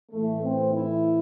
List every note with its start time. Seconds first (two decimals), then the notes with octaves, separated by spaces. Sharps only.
0.11 A2 E3 A3
0.41 C4
0.72 E4